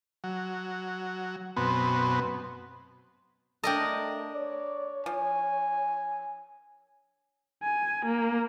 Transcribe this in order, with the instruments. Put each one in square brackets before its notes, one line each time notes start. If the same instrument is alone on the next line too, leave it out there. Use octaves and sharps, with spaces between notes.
[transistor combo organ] F#3
F#2 B2 B3 C4
[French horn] A3 [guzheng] D4 A#4 D#5 [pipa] A4 G5
[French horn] C#5 [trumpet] D5
[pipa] F3 [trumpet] G#5
[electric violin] G#5
A#3